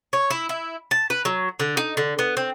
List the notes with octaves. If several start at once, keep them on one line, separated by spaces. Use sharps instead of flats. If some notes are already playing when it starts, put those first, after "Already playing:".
C#5
E4
E4
A5
B4
F#3
D3
D#4
D3
B3
C4